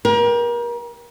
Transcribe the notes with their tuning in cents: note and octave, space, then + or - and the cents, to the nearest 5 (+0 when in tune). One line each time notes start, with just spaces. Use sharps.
G4 +15 A#4 +35